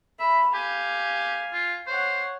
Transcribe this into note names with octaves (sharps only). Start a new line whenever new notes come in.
E5 B5
G4 F5 G#5
F4
C5 C#5 F#5